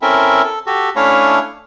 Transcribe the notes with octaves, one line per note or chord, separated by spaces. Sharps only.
C4 C#4 E4 A4 A#4 E5
A4
F#4 G4 A4
A3 C#4 D4 E4 C#5 F5